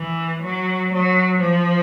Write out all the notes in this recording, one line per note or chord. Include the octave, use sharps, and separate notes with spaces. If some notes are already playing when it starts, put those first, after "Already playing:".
Already playing: E3
F#3
F#3
F3